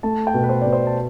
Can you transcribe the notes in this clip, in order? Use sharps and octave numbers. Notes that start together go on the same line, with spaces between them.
A3 A5
G5
B2
B4
C5
B2 D5
C5
A5